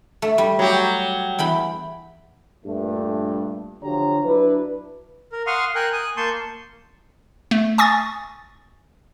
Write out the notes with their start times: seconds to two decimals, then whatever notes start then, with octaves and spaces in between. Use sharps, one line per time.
0.22 A3
0.38 G3
0.59 F#3 G4
1.39 E2 G5 B5
2.65 G2 A#2 A3
3.83 D3 F3 F#3 G4 C#5 A#5
4.24 F#3 D4 E4 B4
5.32 A#4
5.47 F5 F#5 C6 C#6 D#6 F6
5.75 A#4 G5 G#5 F#6
5.93 G#5 D#6 F#6
6.17 A#3 A5 C6 C#6 G6
7.51 A3
7.78 G#5 C#6 D#6 A6